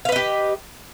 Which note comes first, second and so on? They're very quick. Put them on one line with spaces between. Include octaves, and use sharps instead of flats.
F5 B4 D#5 G4